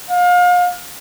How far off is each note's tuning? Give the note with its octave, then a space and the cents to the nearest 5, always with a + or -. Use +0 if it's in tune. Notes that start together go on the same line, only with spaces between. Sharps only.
F5 +35